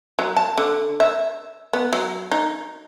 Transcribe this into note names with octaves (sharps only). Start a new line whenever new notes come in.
F#3
A5
D3
E5
B3
F#3
D#4